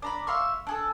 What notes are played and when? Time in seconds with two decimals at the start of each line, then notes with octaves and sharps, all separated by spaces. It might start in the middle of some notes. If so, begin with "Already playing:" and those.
0.02 D4 A#5 B5
0.27 E5 F5 C6 C#6
0.67 D4 G#4 A4